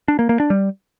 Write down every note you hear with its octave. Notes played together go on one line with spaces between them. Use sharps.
D4
A#3
A#3
D4
G3